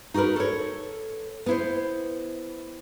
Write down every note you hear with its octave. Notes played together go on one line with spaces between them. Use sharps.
D#4 F#4 G#4 A#4 B4
A4 C#5
B3 E4 C5